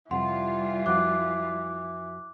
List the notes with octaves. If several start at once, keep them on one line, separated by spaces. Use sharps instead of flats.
F2 C3 E3 G3 F4 F#5 C6
F2 F3 F#4 D6 F#6